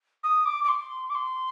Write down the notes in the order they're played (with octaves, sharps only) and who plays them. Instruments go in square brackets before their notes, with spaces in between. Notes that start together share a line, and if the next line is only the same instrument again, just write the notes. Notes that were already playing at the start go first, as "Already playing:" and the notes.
[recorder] D#6
D6
D6
C6
D6
C6